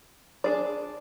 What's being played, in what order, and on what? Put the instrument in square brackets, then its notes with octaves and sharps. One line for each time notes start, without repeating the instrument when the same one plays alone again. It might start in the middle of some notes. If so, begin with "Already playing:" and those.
[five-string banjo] D4 G#4 D5